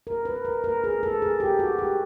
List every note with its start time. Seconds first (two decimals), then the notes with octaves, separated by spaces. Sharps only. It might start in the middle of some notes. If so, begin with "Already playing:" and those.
0.07 A#4
0.25 B4
0.45 A#4
0.64 A#4
0.84 G#4
1.03 A4
1.22 G#4
1.40 G4
1.59 F#4
1.79 G4